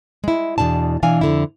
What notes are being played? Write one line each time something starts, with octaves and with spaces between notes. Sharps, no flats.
G#3 E4
E2 G#2 B2 D4 A5
B2 E3 D4 F5 G#5
F2 D3 E4